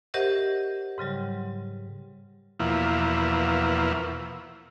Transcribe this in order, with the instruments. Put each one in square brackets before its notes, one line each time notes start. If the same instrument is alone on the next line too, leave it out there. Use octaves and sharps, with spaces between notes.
[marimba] G4 A#4 C5 D#5 E5 F#5
G#2 C#3 F#3 G3
[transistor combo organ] E2 B2 F3 A#3 E4